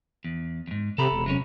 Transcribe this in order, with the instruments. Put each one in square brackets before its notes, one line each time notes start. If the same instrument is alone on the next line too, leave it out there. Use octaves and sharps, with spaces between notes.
[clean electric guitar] E2
E2 G#2
[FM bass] C3 [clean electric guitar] A4 A#5 B5
[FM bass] E1
[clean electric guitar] C3 F#3 C#4